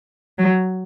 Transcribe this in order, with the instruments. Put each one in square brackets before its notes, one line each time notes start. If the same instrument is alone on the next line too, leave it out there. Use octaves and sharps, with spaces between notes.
[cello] F#3